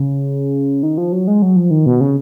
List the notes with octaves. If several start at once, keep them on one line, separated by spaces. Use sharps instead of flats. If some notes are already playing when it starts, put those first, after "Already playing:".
Already playing: C#3
D#3
F3
F#3
G#3
F#3
F3
D#3
B2
C#3